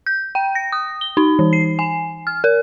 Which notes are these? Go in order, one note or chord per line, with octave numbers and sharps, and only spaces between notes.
G6
G5
A#6
D#6
G7
D#4
E3
C7
G#5
F6
A#4